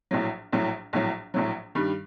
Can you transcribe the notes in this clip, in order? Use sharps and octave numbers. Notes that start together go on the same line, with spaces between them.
A#1 A2 F#3
A#1 A2 F#3
A#1 A2 F#3
A#1 A2 F#3
G2 D#3 G3